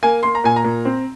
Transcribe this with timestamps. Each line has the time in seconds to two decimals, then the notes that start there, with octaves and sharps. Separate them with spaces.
0.03 A#3 G#5
0.23 A#3 C6
0.35 A#5
0.44 A#2 G#5
0.56 A#5
0.64 A#2
0.85 C4